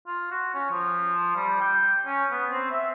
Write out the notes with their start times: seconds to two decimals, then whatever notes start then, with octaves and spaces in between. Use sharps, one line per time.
0.07 F4
0.31 F#4
0.55 C#4
0.71 F3
1.36 G3
1.60 G5
2.06 C#4
2.31 B3
2.51 C4
2.71 E5